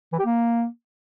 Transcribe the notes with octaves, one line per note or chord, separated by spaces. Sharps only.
E3
G4
A#3